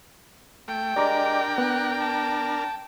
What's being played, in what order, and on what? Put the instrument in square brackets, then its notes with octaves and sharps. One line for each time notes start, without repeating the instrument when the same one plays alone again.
[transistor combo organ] A3 [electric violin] G5
[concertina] G#3 G4 [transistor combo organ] D4 A#4 [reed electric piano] D5 A#5 D6
[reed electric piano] B3 [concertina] F#6
[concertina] A5